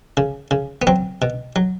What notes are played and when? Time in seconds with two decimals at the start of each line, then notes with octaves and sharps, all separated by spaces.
0.17 C#3
0.51 C#3
0.82 B3
0.87 F#3 C4
1.22 B2
1.56 F#3